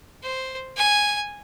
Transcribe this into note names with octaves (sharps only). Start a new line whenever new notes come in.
C5
G#5